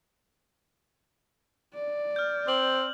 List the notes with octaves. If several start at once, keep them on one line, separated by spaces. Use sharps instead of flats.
D5
F6 G6
C4 D6 F#7